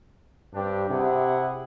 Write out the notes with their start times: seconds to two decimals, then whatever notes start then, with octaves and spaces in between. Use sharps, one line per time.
0.54 G2 C4 D4 G4
0.90 C3 E4 G#4 F#5